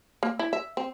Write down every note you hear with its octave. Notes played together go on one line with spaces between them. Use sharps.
A#3
E4
E5
C4